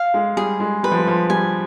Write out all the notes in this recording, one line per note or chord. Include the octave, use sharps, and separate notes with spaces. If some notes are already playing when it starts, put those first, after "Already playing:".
Already playing: F5
G#3
G3 G#4
G#3
G3 B4
F3
G3
F3
G3 G#5